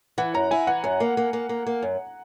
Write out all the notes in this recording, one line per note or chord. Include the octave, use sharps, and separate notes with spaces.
E3 F#5
F#2 A#5
E4 G#5
E3 F#5
F#2 G#5
A#3
A#3
A#3
A#3
A#3
F#2